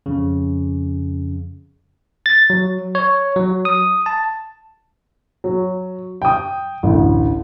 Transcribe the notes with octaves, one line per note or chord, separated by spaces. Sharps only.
F2 C#3
A6
F#3
C#5
F#3
D#6
A5
F#3
G5 D#6
A1 D2